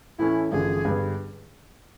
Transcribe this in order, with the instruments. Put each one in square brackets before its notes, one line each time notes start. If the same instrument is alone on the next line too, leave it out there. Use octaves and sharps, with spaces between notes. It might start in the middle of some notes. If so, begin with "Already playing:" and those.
[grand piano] A2 E3 A3 C#4 [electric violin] E4
[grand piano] A1 G2 D3 F3 [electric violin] G#4
[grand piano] G2 D3 G3 B3